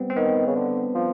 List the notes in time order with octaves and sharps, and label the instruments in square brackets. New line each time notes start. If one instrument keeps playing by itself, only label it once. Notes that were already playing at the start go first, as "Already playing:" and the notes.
Already playing: [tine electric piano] G3 B3 C4
C4
[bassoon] D#3 [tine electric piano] B3
[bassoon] C#3
D3
F3